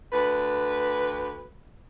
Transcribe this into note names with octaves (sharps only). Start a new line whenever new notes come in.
D2 B4